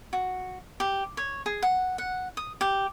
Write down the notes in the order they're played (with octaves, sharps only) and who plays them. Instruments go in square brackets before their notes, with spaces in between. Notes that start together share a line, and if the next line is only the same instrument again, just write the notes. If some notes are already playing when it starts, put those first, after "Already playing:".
[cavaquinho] F#4
G4
C#5
G#4
F#5
F#5
D#6
G4